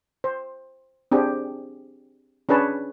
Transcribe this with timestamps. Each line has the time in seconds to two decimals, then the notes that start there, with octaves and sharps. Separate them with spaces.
0.24 C5
1.11 C4 D4 G4 G#4
2.49 C#4 D4 G#4 B4 C#5 A5